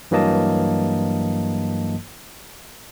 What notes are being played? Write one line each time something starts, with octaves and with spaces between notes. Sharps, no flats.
G2 E3 F#3 A#3 D#5 A5